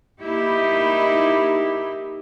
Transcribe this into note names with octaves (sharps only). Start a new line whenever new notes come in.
A#3 D#4 E4 G4